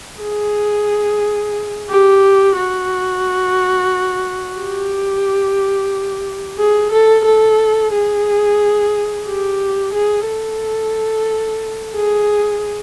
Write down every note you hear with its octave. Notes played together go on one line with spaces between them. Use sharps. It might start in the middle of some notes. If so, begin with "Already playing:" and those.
G#4
G4
F#4
G4
G#4
A4
A4
G#4
G4
G#4
A4
G#4